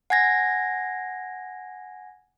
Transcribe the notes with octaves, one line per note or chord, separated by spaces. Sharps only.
F#5 G#5 G#6 A#6